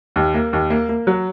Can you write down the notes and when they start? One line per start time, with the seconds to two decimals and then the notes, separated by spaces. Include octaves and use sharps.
0.16 D#2
0.34 A#3
0.53 D#2
0.70 A#3
0.89 A#3
1.07 F#3